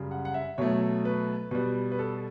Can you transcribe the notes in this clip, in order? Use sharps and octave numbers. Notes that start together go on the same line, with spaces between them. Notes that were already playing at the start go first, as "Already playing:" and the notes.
Already playing: F#2 C#3 G3
F#5
F#5
E5
B2 F#3 A3 C#5
B4
B2 G3 B4
B4
A4